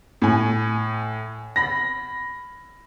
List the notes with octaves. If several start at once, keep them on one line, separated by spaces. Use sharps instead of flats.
A2 G#5
B5 A#6